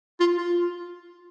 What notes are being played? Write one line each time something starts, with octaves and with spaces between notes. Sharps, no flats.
F4
F4